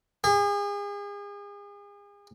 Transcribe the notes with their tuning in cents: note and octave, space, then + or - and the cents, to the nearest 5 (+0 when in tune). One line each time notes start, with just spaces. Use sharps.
G#4 -35